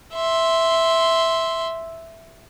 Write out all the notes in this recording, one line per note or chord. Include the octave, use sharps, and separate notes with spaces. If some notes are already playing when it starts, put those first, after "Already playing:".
E5 C6